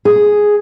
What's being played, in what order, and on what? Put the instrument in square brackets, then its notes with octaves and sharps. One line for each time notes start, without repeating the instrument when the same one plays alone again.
[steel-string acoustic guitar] G#4